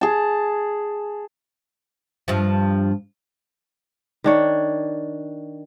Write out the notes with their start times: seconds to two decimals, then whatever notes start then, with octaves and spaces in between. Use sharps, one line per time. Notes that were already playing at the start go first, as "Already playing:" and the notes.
0.01 G#4 A5
2.28 G2 F3
4.24 D#3 D4 C#5